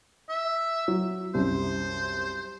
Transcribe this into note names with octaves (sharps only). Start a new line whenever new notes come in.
E5
F#3
C2 F#2 C5